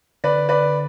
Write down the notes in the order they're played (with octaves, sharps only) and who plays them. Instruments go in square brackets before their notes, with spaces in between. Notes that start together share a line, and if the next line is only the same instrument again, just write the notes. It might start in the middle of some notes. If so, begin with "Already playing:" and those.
[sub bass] D3 [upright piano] B4 D5
[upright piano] B4 D5